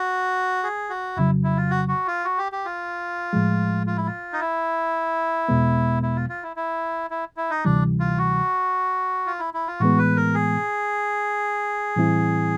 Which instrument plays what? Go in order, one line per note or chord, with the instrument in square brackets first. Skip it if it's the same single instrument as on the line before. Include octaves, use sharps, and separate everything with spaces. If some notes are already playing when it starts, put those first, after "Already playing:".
Already playing: [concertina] F#4
G#4
F#4
[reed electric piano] F2 C#3 F#3 [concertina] E4
[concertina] E4
F4
F#4
F#4
F4
F#4
G4
G4
F4
[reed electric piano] A2 F3 G#3
[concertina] F4
E4
F4
D#4
E4
[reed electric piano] E2 B2 G#3 B3
[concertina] E4
F4
F4
E4
E4
E4
E4
D#4
[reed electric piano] D2 C3 E3 G3 [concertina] D4
[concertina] F4
F#4
F4
E4
E4
F4
[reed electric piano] A2 E3 G#3 B3 [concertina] F#4
[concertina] B4
A#4
G#4
[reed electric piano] A2 E3 G3 C4 E4